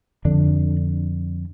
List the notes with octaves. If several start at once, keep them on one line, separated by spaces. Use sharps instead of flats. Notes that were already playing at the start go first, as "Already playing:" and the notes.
F2 D3 D4